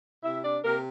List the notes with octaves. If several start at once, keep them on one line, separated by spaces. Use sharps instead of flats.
C3 E4 E5
D4 D5
C3 A#3 A#4